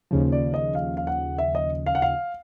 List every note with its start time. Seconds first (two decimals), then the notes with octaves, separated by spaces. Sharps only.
0.11 D#2 C#3 F3
0.32 D5
0.54 D#5
0.75 F5
0.97 F5
1.07 F#5
1.38 E5
1.55 D#5
1.86 F5
1.95 F#5
2.02 F5